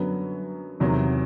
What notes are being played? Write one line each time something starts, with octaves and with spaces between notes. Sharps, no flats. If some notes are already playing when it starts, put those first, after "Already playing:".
Already playing: F#2 D3 F#3 B3
E2 C3 D#3 F#3